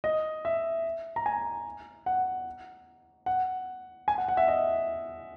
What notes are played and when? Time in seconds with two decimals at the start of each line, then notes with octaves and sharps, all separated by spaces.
0.04 D#5
0.45 E5
1.16 A#5
1.26 G#5
2.06 F#5
3.26 F#5
4.08 G#5
4.18 F#5
4.28 F#5
4.37 E5
4.48 D#5